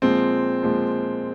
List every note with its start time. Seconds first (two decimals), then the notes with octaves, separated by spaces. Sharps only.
0.02 A#2 F3 G#3 C4
0.63 A#2 F3 G#3